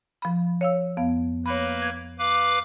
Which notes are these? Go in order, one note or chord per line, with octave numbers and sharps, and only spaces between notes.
F3 B5
C#5 F5 E6
F2 B3 F5
A#3 B4 C#5 B5
G#6
B4 F5 D6